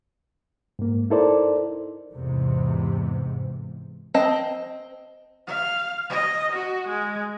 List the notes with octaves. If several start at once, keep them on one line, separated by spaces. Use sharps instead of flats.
G#2 A#3
D#4 E4 A4 A#4 C5 D5
E2 G#2 C3
C4 D#5 G5 A5
F5
D#5
F#4
G#3